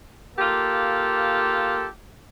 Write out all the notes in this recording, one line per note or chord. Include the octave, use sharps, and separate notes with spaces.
A#3 F4 G4 A4